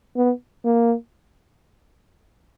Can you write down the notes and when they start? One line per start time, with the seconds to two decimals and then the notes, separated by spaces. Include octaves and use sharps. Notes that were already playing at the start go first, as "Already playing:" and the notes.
0.16 B3
0.65 A#3